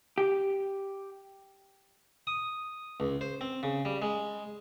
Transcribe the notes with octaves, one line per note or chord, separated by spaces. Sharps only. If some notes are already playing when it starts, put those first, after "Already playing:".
G4
D#6
C#2
C5
C4
C#3
G3
G#3